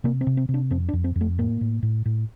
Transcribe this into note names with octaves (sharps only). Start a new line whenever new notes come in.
C3 A#3
C4
C3
C4
C3
D4
F2 C4
D4
F2
C4
F2
A3
A2 A#3
A2
A2
A2